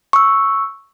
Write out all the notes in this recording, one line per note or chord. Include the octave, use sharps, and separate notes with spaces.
C#6 E6